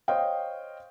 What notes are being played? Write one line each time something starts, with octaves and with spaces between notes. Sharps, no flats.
C5 C#5 D#5 F5 G5